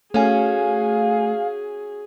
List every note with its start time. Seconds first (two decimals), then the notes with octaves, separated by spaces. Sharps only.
0.14 A3 C#4 F#4 G#4 F5 G#5